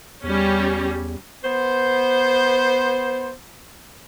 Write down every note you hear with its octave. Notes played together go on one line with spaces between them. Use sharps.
E2 G3 C#4
B3 C5